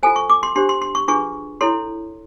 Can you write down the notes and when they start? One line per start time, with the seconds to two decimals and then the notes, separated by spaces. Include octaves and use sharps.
0.03 F4 A4 C5 G#5
0.16 C#6
0.30 D6
0.43 C6
0.56 D4 G4 C5 C6
0.69 C6
0.82 C6
0.95 C#6
1.08 D4 F4 G#4 B4 C#6
1.61 E4 A4 C#5 C6